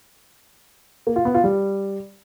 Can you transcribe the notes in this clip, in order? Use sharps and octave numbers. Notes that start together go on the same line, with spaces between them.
A#3
F4
B3
F4
G3